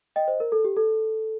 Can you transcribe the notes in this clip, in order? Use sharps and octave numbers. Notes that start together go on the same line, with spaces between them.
D#5 G5
C5 D#5
A#4
A4
G4
A4